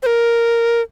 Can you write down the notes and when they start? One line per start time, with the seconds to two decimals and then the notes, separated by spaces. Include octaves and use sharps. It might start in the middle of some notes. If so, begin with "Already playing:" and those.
0.03 C5
0.06 A#4